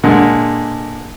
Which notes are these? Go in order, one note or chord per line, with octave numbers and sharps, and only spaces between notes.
A#2 D3 G#3